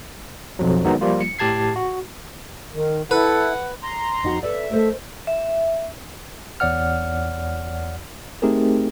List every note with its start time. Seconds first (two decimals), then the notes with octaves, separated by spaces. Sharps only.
0.59 B1 F2 F3 F#3
0.84 D#3 F#3 G#3 B3 D#4
1.01 F3 G3 A#3 F4
1.21 C#7
1.39 A2 G4 A5 G#6 C7
1.76 F#4
2.73 D#3
3.11 E4 A4 B4 F#5
3.83 A#5 C6
4.23 F2 D#4 F#4
4.43 A4 B4 D5 E5
4.71 A3 A#4 C5 D#5
5.27 E5
6.60 E2 C#5 D5 F#5 F6
8.42 A3 C4 D#4 G4 G#4 A#4